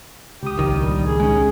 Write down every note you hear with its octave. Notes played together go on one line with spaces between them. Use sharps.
C#2 G4 D#6
A#1 D#3
G3
G#4
G#3 C#4